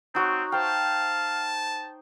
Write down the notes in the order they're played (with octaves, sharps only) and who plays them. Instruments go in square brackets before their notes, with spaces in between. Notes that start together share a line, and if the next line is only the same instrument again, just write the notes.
[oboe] C4 [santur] D#4 F#4 C#5
[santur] C5 G5 [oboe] F5 [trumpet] A5